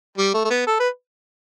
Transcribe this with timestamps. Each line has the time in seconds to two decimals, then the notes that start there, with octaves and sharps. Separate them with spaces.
0.18 G3
0.34 A3
0.45 A3
0.50 B3
0.67 A4
0.80 B4